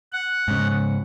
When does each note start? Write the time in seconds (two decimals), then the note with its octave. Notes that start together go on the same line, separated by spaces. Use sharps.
0.13 F#5
0.48 G#2 C#3